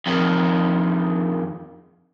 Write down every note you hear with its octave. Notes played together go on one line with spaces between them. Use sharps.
F2 D#3